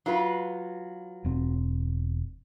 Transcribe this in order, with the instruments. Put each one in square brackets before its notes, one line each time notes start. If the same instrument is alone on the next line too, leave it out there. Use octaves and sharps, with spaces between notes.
[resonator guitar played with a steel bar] F#3 F4 B4
[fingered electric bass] E1 C4